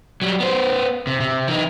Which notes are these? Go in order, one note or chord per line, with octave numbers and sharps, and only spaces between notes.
F#3 G3
B3 C5
C3
C3
E3 D#4